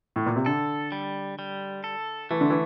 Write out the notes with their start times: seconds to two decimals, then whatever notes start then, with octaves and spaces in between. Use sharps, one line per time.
0.16 A2
0.26 A#2
0.36 C3
0.46 D3 A4
0.92 G3
1.39 G3
1.84 A4
2.30 E3 A3
2.41 D3
2.50 E3